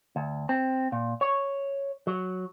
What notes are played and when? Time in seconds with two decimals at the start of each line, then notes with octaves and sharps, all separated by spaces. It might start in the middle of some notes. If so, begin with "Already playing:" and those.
0.16 D2
0.49 C4
0.92 A#2
1.21 C#5
2.07 F#3